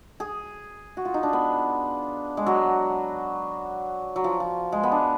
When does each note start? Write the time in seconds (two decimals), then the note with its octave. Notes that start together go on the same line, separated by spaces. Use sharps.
0.20 G#4
0.97 F#4
1.05 F4
1.14 D#4
1.23 D4
1.33 B3
2.37 G#3
2.46 F#3
4.16 F#3
4.24 F3
4.40 F3
4.72 G#3
4.83 B3
4.92 D4